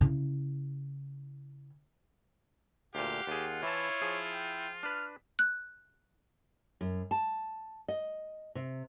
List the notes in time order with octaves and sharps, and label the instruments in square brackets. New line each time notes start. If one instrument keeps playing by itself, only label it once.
[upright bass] C#3 E4
[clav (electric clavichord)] D2 A#2 [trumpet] G4 [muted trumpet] F5 [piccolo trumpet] F#5
[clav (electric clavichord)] D#2 G#4 [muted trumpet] F4
[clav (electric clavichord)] E3 A5 [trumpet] E4 [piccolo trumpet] C#5
[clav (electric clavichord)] F3 G#4
[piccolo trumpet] G5
[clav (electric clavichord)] D4 B4 [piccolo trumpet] F6
[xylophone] F#6
[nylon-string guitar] F#2
A5
D#5
C3